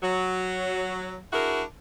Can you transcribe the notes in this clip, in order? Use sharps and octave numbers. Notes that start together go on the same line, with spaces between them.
F#3
D4 E4 F#4 G#4 A#4